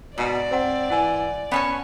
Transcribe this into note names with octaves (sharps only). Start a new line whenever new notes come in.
G#2 B2 D5
C4 C5 F#5
E3 F#5 G#5
B3 C#4 C#5 A5